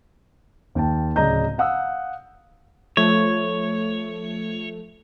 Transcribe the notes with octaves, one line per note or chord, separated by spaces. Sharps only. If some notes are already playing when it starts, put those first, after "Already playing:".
D#2 G5 A5
D1 C#3 D5 D#5 A#5 G6
F5 F#5 D#6 E6
F3 A3 C#5